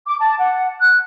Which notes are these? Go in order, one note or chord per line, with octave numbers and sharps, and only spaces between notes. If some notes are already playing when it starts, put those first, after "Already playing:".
D6
A5
F#5
F#6